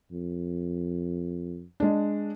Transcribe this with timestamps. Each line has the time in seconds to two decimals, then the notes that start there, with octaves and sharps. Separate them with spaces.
0.11 F2
1.80 G#3 D4